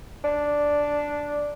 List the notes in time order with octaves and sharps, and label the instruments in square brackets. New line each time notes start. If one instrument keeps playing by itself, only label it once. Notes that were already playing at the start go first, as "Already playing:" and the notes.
[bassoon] D4